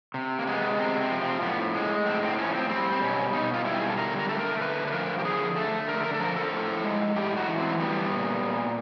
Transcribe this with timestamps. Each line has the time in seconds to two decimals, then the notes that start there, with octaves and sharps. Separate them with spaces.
0.14 C3
0.39 A#3
0.47 G#3 B3
0.79 C3 C4
1.00 C4
1.11 F3
1.21 C4
1.42 A2 B3
1.74 G#3
2.06 A2 C4
2.23 C4
2.38 F3 C#4
2.54 C4
2.69 G3 C4
2.92 C4
3.01 B2 C#4
3.33 B2 D#4
3.54 F4
3.65 G3 E4
3.74 G4
3.81 G#4
3.89 A4
3.97 D3 A#4
4.19 A#4
4.29 A3 A4
4.39 A#4
4.61 D3 B4
4.87 B4
4.92 F3 A#4
5.19 G4
5.25 D3 G#4
5.56 A3 A4
5.88 D3 A#4
6.04 A#4
6.14 A4
6.20 F3 A#4
6.36 A4
6.52 A2
6.84 G#3
7.16 A2 G4
7.37 F#4
7.48 E3
7.59 C4
7.80 G3 B3
8.11 A#2
8.43 A#2